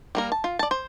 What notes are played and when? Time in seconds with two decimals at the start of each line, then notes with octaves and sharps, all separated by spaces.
0.15 G3 A#3 A#4
0.32 A5
0.44 F4
0.59 D5 A5
0.71 C5